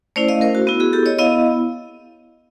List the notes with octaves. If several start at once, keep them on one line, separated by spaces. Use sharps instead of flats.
A3 C#4 E4 C5 D5
D#5 F5
A#4 C5
F#4
B3 E4 F#4
F#4 G#4
G4 A4
C#5 D#5
B3 E4 D#5 F5